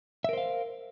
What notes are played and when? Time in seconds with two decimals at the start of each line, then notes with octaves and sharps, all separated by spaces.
0.24 E5
0.29 A#4
0.33 C5
0.38 F5